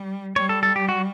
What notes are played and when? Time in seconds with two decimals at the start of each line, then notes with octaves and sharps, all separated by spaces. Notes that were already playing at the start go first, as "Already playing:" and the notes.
Already playing: G3
0.35 G3 C#5
0.49 A4
0.63 A4
0.76 G4
0.89 F#4